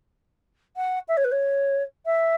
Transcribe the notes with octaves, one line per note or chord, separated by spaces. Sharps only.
F#5
E5
C#5
B4
C#5
E5